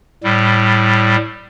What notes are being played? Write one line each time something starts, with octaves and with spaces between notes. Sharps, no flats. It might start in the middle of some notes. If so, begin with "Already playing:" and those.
A2 G3